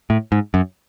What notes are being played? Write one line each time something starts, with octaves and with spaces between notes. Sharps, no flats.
A2
G#2
F#2